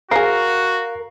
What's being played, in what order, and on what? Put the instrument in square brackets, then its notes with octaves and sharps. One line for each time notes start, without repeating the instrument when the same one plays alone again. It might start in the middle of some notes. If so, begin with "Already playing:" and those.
[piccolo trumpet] F#4 [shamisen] G#4 C5 [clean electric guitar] A#4 [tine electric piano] F5 C7